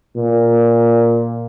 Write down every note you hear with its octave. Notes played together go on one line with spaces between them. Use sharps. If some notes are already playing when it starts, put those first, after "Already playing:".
A#2